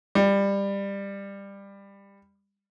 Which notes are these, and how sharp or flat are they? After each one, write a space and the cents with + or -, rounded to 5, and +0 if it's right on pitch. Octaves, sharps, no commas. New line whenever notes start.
G3 +20